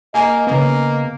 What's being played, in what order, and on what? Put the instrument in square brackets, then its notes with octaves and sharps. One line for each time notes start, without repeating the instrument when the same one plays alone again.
[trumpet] A#3 [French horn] D#5 [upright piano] G#5
[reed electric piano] C#3 B3 [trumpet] A#3